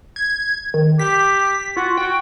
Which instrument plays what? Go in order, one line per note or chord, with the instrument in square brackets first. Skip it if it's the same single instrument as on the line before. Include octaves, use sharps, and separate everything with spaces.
[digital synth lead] G#6
D#3
[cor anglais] G4 [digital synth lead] B6
[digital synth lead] F4 [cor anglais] F#4
[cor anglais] F#4 [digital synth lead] G5